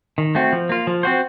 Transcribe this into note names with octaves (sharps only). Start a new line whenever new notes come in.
D#3
A3 C4 F#4
F3
A#3 F4
F3
C4 F#4 C5